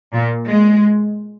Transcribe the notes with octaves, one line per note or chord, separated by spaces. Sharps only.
A#2
G#3